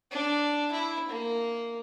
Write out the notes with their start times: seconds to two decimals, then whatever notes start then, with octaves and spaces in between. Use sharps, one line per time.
0.11 D4
0.72 E4
1.10 A#3